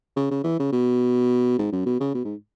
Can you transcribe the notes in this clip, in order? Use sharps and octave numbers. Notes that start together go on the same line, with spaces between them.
C#3
C#3
E3
C#3
B2
G#2
F#2
B2
C#3
B2
G#2